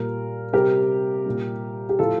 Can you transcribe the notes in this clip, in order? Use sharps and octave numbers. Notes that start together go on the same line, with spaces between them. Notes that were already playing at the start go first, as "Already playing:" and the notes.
Already playing: A#2 G3 A#4
C3 G3 G4 A#4
A#2 G3
G4
A2 F3 A3 F4 A4